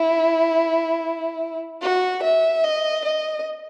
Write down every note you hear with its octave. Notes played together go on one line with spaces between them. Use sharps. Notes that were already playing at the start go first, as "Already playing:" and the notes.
Already playing: E4
F#4
E5
D#5
D#5